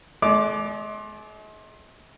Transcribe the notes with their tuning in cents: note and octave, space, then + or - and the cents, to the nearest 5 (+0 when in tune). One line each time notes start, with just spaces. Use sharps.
G#3 +40 D5 +0 D6 +0